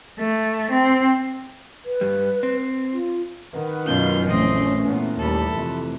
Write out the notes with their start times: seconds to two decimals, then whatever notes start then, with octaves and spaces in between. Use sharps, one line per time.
0.18 A3
0.70 C4
1.85 B4
2.01 G2 G3
2.43 C4
2.92 F4
3.53 D#3 B4 F#5
3.85 F#2 B2 C#4 F4 F5 F6 G6
4.27 A#1 E3 A3 C4 D#5
4.85 A#2 B3
5.19 D#2 G3 A4 B5
5.54 F2 C3